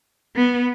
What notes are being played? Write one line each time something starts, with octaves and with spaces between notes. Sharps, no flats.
B3